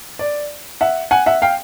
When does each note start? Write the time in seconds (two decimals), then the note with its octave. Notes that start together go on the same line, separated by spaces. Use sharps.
0.19 D5
0.81 E5 F#5
1.11 F#5 G#5
1.26 E5 F#5
1.42 F5 G5